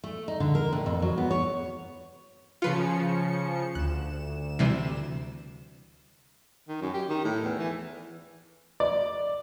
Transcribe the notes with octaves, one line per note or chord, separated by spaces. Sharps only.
A3
D#4
D3
A#4
A2
F2
F#3
B3
C#5
C#3 F3 F4 B4 C7 C#7
D2 F#6 E7
C3 E3 G3
D#3
F#2
G4
D#3
A2
E2
E3
D5